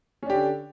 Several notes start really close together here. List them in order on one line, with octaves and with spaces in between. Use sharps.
C#4 D4 G4 D3